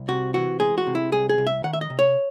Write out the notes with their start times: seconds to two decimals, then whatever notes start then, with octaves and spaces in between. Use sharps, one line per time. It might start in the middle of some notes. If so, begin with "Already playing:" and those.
Already playing: C2
0.08 C3 F#4
0.34 E3 F#4
0.60 G#3 G#4
0.78 F#4
0.87 C3
0.95 E4
1.12 C2 G#4
1.29 G#4
1.38 C2
1.47 E5
1.64 D#3 F#5
1.73 E5
1.81 D#5
1.90 C3
1.99 C#5